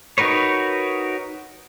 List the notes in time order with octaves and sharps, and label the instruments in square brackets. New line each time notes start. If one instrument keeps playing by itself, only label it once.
[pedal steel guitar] D#4 F#4 A#4 B4 C#5